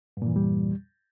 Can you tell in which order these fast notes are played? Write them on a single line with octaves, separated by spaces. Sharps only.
G2 A#2 E3 E2 G3